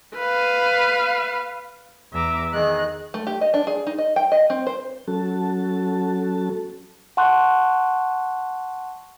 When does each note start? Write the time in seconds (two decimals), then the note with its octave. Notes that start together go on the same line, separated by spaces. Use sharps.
0.16 B4 F5
2.12 E2 E5 A#5 D6
2.52 D#3 G#4 D#5 F#6
3.14 A3
3.27 G4
3.41 D#5
3.54 D4
3.67 G#4
3.87 D#4
3.98 D#5
4.16 G5
4.32 D#5
4.50 C4
4.67 C5
5.08 F#3 C#4 F#4 A4 A5
7.17 F#5 A5 C6 C#6 F#6